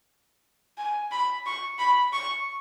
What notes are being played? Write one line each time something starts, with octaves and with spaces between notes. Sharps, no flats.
G#5
B5
C#6
B5
C#6